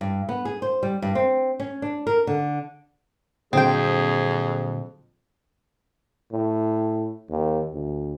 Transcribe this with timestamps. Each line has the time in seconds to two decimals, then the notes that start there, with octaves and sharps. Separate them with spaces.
0.01 G2
0.29 B3
0.45 G#4
0.62 C5
0.83 G3
1.02 G2
1.15 C4
1.60 C#4
1.82 D4
2.07 A#4
2.27 D3
3.53 F2 A#2 D3 F#3 C4 G#4 G5
6.32 A2
7.29 D#2
7.74 D2